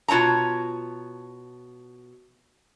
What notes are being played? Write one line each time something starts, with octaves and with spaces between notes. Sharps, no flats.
B2 F4 C#5 A5 A#5